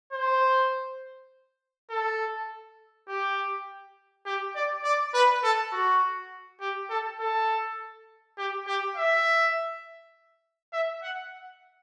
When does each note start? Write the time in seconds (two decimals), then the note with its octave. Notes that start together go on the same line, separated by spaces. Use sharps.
0.13 C5
1.90 A4
3.08 G4
4.26 G4
4.55 D5
4.84 D5
5.14 B4
5.44 A4
5.73 F#4
6.61 G4
6.90 A4
7.20 A4
8.37 G4
8.67 G4
8.96 E5
10.73 E5
11.03 F#5